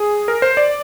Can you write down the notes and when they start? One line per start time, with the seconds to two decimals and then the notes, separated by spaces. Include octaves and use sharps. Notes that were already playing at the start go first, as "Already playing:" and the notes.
Already playing: G#4
0.28 A#4
0.42 C5
0.57 D5